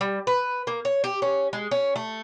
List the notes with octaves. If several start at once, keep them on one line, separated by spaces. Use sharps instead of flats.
G3
B4
A#3
C#5
G4
C#4
G#3
C#4
A3